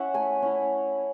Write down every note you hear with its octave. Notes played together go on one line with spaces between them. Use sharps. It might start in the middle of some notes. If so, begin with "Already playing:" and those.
Already playing: C#4 E4 E5 F#5
A3 G#5
C#4 E4